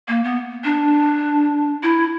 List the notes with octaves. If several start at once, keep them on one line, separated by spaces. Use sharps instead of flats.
A#3
B3
D4
E4